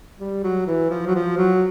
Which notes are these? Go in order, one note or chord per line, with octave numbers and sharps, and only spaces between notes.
G3
F#3
E3
F3
F#3
F3
F#3